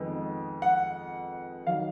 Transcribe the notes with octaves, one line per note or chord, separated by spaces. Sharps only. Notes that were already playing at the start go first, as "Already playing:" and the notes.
Already playing: F2 D#3 G#3 B3
F#5
D#3 F#3 F5